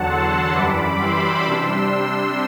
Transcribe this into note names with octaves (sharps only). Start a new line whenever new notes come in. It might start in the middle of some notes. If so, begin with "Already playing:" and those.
Already playing: E2 D3 F#3 F#5 A5
C6 E6
F#2 E3 G3 B5 D6
C6 E6
C3 G3 D4 C6 E6